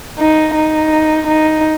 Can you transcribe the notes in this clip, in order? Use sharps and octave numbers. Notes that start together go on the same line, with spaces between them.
D#4
D#4
D#4